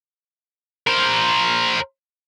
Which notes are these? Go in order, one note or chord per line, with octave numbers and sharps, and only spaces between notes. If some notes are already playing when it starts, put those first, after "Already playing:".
A#4 C5